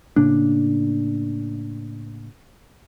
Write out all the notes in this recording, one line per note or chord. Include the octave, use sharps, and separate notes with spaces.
A2 C#3 A#3 D4